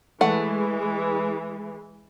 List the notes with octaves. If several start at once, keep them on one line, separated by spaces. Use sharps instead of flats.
E3 G#3 A3 F#5